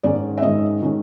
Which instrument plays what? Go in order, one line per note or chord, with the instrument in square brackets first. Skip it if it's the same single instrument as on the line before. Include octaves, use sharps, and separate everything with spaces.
[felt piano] G#2 D#3 G#3 C#4 D5
E5
G#2 D#3 G#3 C#4 D#5
D#3 G#3 C#4